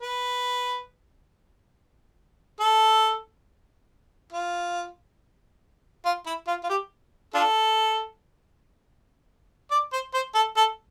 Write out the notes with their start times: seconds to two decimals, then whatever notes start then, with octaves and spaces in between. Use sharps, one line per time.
0.02 B4
2.60 A4
4.33 F4
6.05 F4
6.26 E4
6.48 F4
6.64 F4
6.70 G4
7.34 D4 F4 A4
9.71 D5
9.93 C5
10.14 C5
10.35 A4
10.57 A4